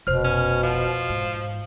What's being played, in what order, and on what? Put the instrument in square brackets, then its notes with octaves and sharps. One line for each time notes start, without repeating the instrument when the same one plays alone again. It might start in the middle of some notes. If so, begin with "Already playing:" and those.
[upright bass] F1 C2 [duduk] B2 [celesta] C5 F6
[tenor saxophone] C#4
F3
[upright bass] G#2